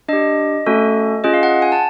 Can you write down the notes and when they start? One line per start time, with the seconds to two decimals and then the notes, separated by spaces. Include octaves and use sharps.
0.08 D4 G4 D#5
0.66 A3 C#4 F#4 A4
1.24 C#4 F4 G#4 D#5
1.34 F5
1.43 F#5
1.62 G#5
1.72 A5